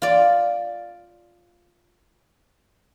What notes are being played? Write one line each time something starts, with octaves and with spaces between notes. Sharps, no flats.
F4 D5